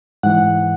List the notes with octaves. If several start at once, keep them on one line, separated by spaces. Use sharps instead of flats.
G#2 E3 F#5